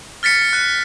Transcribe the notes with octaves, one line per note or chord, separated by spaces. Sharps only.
F6 A6 B6 C#7
F#6